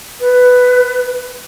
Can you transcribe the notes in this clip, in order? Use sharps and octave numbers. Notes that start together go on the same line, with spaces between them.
B4